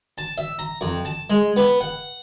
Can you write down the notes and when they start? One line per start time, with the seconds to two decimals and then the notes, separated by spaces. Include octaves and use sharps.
0.18 A5
0.38 E5
0.59 A#5
0.81 F2
1.05 A5
1.30 G#3
1.57 B3
1.81 F#5